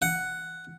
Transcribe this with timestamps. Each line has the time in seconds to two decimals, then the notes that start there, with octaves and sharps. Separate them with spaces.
0.02 F#5